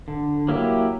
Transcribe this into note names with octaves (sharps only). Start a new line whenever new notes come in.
D3
F#3 A#3 E4 G4